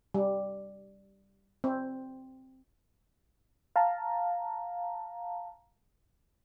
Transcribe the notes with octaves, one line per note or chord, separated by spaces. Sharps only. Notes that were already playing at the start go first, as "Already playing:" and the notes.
G3
C4
F5 A5 A#5